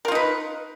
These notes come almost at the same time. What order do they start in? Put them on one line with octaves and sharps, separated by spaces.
A#4 F4 D#4 B4